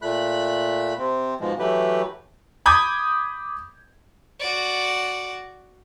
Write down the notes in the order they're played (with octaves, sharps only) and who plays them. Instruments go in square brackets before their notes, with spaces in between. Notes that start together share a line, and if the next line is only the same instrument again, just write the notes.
[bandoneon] A#2 A3 B5 F#6
C3 C4
G#2 B2 F3 G#3
E3 F#3 A3 G4 B4
[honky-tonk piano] B5 D6 D#6 G6 G#6
[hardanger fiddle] F#4 D5